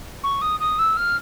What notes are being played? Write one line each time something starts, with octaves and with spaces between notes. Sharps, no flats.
C#6
D#6
D#6
E6
F6